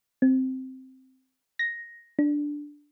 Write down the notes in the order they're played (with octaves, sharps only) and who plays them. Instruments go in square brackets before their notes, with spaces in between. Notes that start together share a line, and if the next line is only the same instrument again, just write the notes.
[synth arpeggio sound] C4
A#6
D4